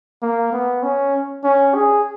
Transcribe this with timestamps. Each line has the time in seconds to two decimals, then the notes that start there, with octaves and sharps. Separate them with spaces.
0.22 A#3
0.53 B3
0.83 C#4
1.44 C#4
1.75 G#4